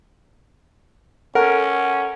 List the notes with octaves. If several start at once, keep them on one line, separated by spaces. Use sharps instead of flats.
C#4 A4 A#4 F#5